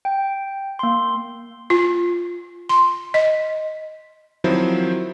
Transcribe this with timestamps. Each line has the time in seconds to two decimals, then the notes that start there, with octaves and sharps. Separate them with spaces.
0.05 G5
0.79 A#3 C6
1.70 F4
2.69 C6
3.14 D#5
4.44 D#3 F3 F#3 C4 E4 C5